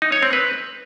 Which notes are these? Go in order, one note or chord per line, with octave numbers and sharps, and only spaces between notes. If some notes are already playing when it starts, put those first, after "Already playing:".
D#4
C#5
C4
B4